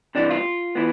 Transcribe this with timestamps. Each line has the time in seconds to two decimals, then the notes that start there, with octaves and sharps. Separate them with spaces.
0.15 C3 E3 G3 D4
0.30 F4
0.75 E3 B3